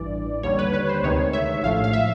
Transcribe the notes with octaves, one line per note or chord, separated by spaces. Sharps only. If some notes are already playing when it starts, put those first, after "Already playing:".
Already playing: A1 G2 E3 D5
D#2 D3 G3 C#5
B4
B4
C5
D2 C3 D#3 G#3 C#5
E5
A#1 A2 F3 A3 F5
F5
E5